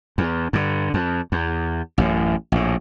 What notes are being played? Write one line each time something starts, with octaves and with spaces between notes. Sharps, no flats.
E2
G2 D3
F2
E2
A1 F#2 A2
A#1 A2